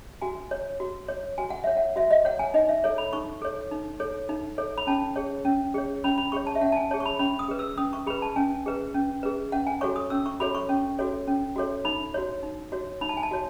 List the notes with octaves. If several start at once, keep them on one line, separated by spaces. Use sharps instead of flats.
F#4 G#5
C#5
F#4
C#5
F#4 G#5
F#5
C#5 E5
F#5
F#4 E5
D#5
C#5 F#5
G#5
D#4 D#5
E5
A4 C#5
B5
D#4 C#6
A4 C#5
D#4
A4 C#5
D#4
A4 C#5
B5
C#4 A5
G#4 C#5
C#4
G#4 C#5
C#4 B5
B5
G#4 C#5 C#6
A5
E5
C#4 F#5
A5
G#5
G#4 C#5 A5
C#6
B5
C#4 B5
D#6
G#4 B4
E6
C#4 D#6
C#6
G#4 B4 B5
A5
C#4 G#5
G#4 B4
C#4
G#4 B4
C#4 F#5
G#5
F#4 A4 C#5 C#6
D#6
C#4 E6
C#6
F#4 A4 C#5 B5
C#6
C#4
F#4 A4 C#5
C#4
F#4 A4 C#5
D#4 B5
F#4 C#5
D#4
F#4 C#5
D#4 B5
A5
G#5
A5
F#4 C#5